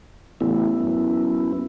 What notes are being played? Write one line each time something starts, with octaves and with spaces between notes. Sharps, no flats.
A1 B3 E4
F#2